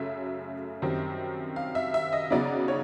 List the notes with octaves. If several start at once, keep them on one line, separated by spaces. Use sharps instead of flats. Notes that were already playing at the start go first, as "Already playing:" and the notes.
Already playing: F#2 C#3 F#3 A3 E5
F#2 D#3 G3 C4
F5
E5
E5
D#5
C#3 F#3 B3 D#4 D5
C#5